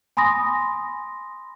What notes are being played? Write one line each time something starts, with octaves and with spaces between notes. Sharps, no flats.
G#5 B5 C6 D#6 A#6